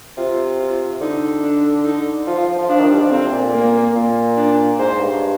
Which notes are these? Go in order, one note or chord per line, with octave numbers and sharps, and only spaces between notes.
C3 F4
F4
D3 D#4
D4
D#4
F3 F4
F3
F3
F3
F3 D4
D#3
G3
F3
D3 C4
C3
A#2
A#3
A#2
D4
G#2 C5
G2